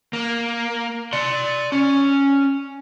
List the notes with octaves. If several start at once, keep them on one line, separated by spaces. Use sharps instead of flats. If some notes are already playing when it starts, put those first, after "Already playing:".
A#3
D5 C6
C#4